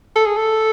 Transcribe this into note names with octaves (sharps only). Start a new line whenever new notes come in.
A4
G#4
A4